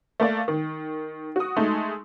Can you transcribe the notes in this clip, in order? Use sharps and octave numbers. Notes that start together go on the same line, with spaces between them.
A3 A#3 D5
D#3
F#4 D#6
G#3 A3 D#4